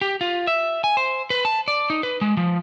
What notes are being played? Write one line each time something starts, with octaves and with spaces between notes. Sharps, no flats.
G4
F4
E5
G#5
C5
B4
A5
D5
D#4
B4
G#3
F3